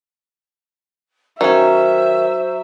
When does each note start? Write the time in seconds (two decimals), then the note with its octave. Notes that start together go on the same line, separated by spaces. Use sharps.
1.41 D#3 F#3 C#4 C5 E5